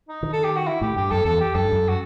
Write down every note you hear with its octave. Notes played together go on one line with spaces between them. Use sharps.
D#4
D#3
A4
G4
F#4
E4
A2 G4
G2 G4
F#2 A4
E2 A4
G4
F#2 A4
G2
F#2
F#4